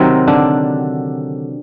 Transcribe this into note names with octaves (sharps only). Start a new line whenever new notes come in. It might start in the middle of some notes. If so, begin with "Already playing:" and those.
Already playing: C3 D#3 F#3 C4
D3 D4